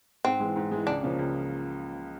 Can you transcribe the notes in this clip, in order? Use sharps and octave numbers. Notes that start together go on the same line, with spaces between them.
G#2 C4
E3 G#3
G#2
E3 G#3
C#2 D4
C#3 F3 A#3
C#2